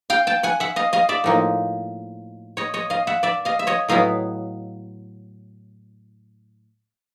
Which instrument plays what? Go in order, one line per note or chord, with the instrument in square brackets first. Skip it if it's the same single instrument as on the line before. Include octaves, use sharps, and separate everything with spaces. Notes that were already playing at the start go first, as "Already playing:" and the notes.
[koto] F5 G5
G5 A5
F#5 G#5
E5 F#5
D#5 F5
D#5 F5
D5 E5
A2 F3 A#3 D#4
C#5 D#5
C#5 D#5
D#5 F5
E5 F#5
D5 E5
D#5 F5
E5
C#5 D#5
A2 F#3 B3 E4 D#5 F5